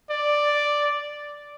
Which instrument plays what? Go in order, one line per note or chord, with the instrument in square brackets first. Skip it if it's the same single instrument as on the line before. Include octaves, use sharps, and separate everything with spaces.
[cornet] D5